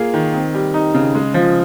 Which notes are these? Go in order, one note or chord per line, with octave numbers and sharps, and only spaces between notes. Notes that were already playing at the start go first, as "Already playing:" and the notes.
Already playing: A#3 F4 G#4
D#3
C4
G3
D#4
C#3
G#3
F3